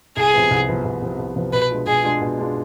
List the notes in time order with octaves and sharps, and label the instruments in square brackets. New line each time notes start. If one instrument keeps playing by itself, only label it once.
[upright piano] C2 [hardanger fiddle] G#4
[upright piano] C3 F3 B3
C2
C3 F3 B3
C2
C3 F3 B3
C2
C3 F3 B3
[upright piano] B2 [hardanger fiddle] B4
[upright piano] G#3 D4 F4
[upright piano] B2 [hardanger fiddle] G#4
[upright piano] G#3 D4 F4
B2
G#3 D4 F4